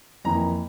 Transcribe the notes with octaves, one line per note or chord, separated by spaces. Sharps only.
F2 E3 A#3 A#5